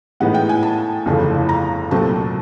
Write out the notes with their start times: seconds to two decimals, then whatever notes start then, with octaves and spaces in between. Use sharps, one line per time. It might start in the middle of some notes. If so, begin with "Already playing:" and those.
0.20 A2 E3 G#3 B3 D#4 F#5
0.34 G5
0.49 G#5
0.63 A5
1.06 G1 F2 C#3 E3 A3
1.49 A#5
1.91 C2 A#2 F#3 A3 C4 A5